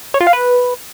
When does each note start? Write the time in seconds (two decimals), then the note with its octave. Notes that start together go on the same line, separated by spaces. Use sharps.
0.14 C#5
0.20 F4
0.27 F5
0.33 B4